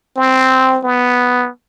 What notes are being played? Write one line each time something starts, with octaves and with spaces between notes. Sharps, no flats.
C4
B3